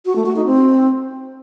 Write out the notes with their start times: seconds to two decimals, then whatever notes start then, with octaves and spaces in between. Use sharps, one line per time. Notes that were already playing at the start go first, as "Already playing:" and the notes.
0.06 F#4
0.16 A3
0.26 F#4
0.36 D#4
0.46 C4